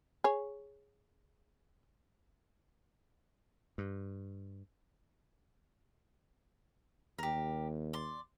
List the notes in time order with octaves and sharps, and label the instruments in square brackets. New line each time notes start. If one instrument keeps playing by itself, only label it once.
[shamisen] G#4 C#5
[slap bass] G2
[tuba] D#2 [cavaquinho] G4 A#4
[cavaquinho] D5 C6